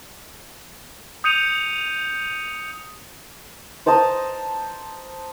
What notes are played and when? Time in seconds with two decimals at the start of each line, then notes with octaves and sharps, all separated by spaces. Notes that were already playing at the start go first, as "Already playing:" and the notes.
1.24 D#6 G6 C#7 D#7 F7
3.86 C5 A5 A#5 D#6